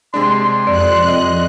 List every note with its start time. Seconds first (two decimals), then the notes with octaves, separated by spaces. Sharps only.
0.14 C3 G#3 D4 C6
0.67 F2 C3 D5 F#6
1.07 D#5